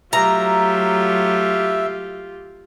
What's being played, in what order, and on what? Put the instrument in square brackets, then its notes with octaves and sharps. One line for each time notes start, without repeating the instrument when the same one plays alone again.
[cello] F#3 A3 [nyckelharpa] F4 G4 [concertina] E5 [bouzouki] A#5